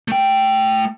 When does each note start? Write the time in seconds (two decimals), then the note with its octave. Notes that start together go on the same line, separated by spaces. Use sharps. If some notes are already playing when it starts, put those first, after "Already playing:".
0.08 A3 G5